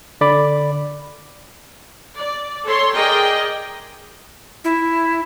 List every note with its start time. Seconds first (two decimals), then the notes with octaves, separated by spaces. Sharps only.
0.21 D3 D5 B5 D6
2.17 D5
2.65 A4 C#5 C6
2.94 G#4 A#4 D5 D#5 G5
4.64 E4